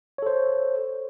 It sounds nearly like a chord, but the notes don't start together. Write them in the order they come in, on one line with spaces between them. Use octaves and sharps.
C#5 A4 C5